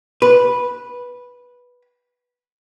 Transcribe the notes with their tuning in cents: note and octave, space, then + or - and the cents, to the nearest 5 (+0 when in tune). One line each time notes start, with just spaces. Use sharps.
B4 -10